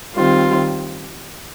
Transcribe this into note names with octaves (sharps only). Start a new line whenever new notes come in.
D#3 G3 C4 F4